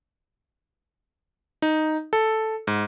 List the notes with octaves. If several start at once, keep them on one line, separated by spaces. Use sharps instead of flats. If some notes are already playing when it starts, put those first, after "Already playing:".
D#4
A4
G#2